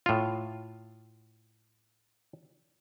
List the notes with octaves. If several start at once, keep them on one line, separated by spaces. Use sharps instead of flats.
A2 F4